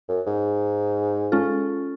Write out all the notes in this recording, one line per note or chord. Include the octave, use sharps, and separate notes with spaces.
F#2
G#2
G#3 C#4 F4 A4